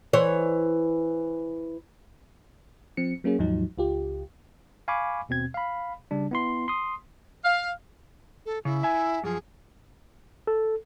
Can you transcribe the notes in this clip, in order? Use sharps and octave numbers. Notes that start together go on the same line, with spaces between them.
E3 C5 C#5
F3 C4 C#7
F#3 A#3 C#4 G#4
D#2 G#2 F3 F#3 D#4
C#2 F4 G4
F5 G#5 B5 C#6 D6
D#2 B2 C4 G#6
F5 B5
C#3 G3 D4
B3 E4 C6
C6 D#6
F5
A4
C#3 E4
E5 G#5
F#2 F3 G#4
A4